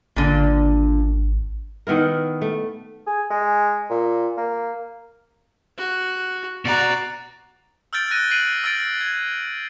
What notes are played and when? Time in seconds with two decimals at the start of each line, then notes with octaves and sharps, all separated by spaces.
0.16 G#1 A#2 D3
1.87 D#3 B3 E4 A#4
2.41 A3
3.07 G#4
3.30 G#3
3.90 A#2
4.37 A#3
5.77 F#4
6.65 B2 F#4 D5 A#5
7.93 E6 F6 G6 A6 D7
8.11 F#6 A#6 D#7
8.31 F#6 C7 D7 D#7 F#7
8.64 E6 F6 A6 D7
9.01 G#6